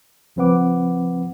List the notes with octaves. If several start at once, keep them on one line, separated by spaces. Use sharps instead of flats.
C#2 F3 C4 B4 F#5 D6